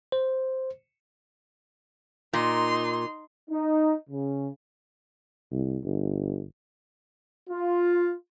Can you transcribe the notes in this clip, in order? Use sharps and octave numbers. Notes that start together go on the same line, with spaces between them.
C5
A#2 D#4 C6
D#4
C#3
C2
G1
F4